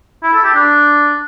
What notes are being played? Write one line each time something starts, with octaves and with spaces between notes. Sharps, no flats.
E4
A4
G4
D4